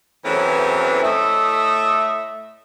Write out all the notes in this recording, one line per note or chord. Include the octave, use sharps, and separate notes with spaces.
E2 E3 F#3 A3 C4 C#4
A2 A3 D#5 E5